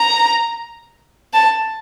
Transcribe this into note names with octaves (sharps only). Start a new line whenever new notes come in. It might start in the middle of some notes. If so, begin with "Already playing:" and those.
Already playing: A#5
A5